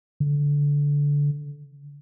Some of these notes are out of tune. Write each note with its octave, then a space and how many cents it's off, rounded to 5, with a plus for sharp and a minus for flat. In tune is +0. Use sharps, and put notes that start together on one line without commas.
D3 -20